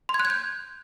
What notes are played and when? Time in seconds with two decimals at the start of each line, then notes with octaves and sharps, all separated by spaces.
0.09 C6
0.14 G#6
0.20 F#6
0.25 G#6
0.30 G6